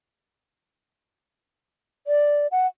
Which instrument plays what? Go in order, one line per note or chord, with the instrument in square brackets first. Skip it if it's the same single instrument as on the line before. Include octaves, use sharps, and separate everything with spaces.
[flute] D5
F#5